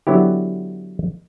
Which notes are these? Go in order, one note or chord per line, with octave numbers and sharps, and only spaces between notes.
D3 F#3 B3 E4 G4